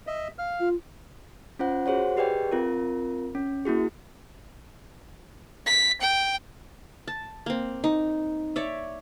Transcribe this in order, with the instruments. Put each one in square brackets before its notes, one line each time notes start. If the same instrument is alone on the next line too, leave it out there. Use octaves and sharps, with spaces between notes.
[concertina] D#5 E5
F5 F6
[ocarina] F4
[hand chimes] C#4 F4 C5 F#5
F#4 G#4 C5 C#5 F#5
G4 G#4 B4 D5 D#5 G5
C4 F4 A#4
C#4
A#3 E4 F#4 G#4
[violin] B6
G5
[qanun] A5
A#3 C4
D#4
C#5 D5 E5